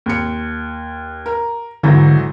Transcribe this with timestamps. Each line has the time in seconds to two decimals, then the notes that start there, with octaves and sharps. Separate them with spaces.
0.06 D#2 C#7
1.26 A#4
1.83 G#1 D3 E3 F#3